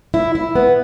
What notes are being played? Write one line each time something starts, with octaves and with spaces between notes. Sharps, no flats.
E4
E4
B3